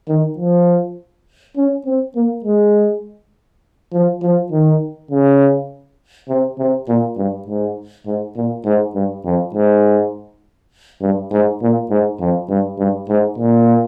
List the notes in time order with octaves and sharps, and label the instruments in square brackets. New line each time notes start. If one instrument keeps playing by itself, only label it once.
[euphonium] D#3
F3
C#4
C4
A#3
G#3
F3
F3
D#3
C#3
C3
C3
A#2
G2
G#2
G#2
A#2
G#2
G2
F2
G#2
G2
G#2
A#2
G#2
F2
G2
G2
G#2
A#2